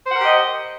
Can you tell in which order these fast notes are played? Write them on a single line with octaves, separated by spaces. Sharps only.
C5 F#5 A#4 G4 D#5